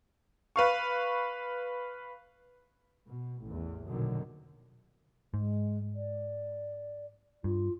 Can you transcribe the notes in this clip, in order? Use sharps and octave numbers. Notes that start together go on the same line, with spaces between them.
B4 F5 C#6
B2
A1 E2
A#1 F#2 B2 D3 D#3 F#3
G#2 G#3
D5
G2 F4